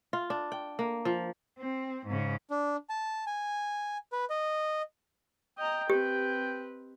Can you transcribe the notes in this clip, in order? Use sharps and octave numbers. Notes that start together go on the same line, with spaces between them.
F4
D4
G5
A#3
F3
C4
G#2 C#3
D4
A5
G#5
B4
D#5
D#5 G5 A#5
C4 G4 B4